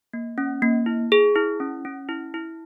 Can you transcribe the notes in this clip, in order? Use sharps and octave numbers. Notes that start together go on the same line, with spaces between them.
A#3
C#4
A#3
E4
G#4
E4
C#4
C#4
E4
E4